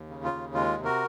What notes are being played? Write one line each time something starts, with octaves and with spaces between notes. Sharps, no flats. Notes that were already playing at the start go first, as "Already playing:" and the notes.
Already playing: D#2
C#3
F4
D#2
G#3 F4
C3
F#4 A#4